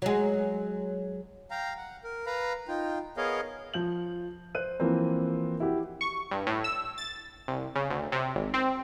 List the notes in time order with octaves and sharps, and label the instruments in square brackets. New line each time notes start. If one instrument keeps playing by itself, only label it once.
[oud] F#3 G#3
[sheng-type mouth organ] F5 G5 A#5
F#5
A#4
B4 F5 A#5 B5
D#4 F4 G5
B3 G#4 A#4 C#5 D#5 F5
[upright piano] F3 G6 F#7
C5 F#6 D#7
E3 F3 A#3 C4
E4 F#4 G4
[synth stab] C#6
G2
A2
E6
A6
C2
C#3
D2
C3
G#1
C4